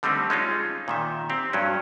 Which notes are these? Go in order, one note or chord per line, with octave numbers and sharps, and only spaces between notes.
D3 G3 A3 C4 D#4
G#3 C#4 D#4 F4
A#2 D#3 E5
C4 G4
G2 F#3 C#4